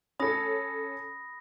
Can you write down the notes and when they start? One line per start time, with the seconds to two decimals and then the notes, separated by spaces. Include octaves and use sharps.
0.20 C#4 A4 B5 D#6 A#6